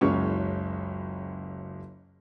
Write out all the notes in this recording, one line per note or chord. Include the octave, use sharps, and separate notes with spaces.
F#1 C#2 F#2 C#4 C#5 C#6